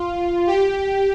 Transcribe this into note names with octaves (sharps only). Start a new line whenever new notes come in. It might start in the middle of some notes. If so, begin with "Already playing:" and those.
Already playing: F4
G4